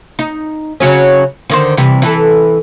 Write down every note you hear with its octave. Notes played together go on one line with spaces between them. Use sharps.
D#4
C#3 F#3 C#4
D3 D#3 C5
C3 E3 G3
E3 A4